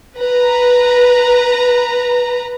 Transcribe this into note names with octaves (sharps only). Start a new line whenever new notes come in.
B4 A#5